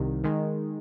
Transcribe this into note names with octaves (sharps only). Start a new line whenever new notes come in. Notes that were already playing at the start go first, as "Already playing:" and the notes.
Already playing: C2 C3 D#3
D#3 G#3